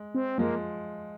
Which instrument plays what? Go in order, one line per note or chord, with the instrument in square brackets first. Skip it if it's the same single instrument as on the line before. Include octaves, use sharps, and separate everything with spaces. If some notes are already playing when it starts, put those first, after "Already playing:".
Already playing: [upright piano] G#3
[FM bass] C4
[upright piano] F3 G#3 [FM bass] A#3